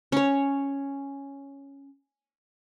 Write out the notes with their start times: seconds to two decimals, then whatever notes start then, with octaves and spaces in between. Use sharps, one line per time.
0.12 C#4 C#5